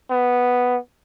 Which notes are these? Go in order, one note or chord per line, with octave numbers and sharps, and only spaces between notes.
B3